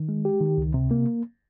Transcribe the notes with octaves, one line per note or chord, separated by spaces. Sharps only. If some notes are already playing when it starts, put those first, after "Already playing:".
Already playing: D#3
G#3
G4
D#3
C#2
C3
A#3